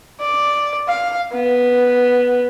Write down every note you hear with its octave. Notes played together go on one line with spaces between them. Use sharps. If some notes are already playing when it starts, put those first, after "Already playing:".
D5
F5
B3